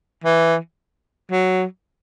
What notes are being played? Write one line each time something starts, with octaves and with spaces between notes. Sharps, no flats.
E3
F#3